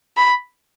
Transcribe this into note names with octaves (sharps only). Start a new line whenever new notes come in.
B5